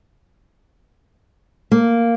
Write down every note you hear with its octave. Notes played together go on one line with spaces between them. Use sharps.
A#3